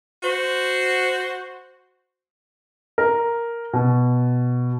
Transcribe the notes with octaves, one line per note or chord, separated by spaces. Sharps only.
F#4 C5
A#4
B2